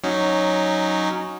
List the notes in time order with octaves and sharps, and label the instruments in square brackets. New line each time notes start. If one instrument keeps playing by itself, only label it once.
[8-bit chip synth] F#3 C#4 D#4